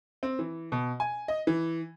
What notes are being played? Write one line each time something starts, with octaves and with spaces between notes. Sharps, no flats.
C4
E3
B2
G#5
D#5
E3